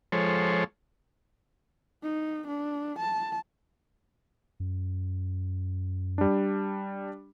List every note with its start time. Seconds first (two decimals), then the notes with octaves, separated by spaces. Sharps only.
0.12 F3 G#3 A4 C5 C#5
2.03 D#4
2.48 D4
2.99 A5
4.60 F#2
6.18 G3 D4